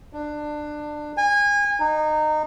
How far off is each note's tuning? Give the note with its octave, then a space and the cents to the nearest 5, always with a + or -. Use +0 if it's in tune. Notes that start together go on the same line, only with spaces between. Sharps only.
D4 +20
G#5 -25
D#4 -20